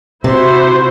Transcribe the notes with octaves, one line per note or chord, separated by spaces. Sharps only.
C3 E4 F#4 C5